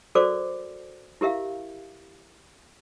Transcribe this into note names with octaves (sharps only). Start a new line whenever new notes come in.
F#4 A4 A#4 C5 D5 D6
E4 G4 A#4 E5 F5